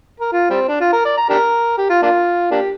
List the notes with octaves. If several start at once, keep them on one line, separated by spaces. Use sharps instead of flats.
A#4
F4
G3 C4
D4
F4
A#4
D5
A#5
D4 G4 A#4
G4
F4
A#3 D4 F4
A#3 D4 G4